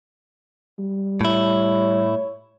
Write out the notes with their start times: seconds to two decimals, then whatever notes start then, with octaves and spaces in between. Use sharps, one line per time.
0.79 G3
1.21 A2 E4 C#5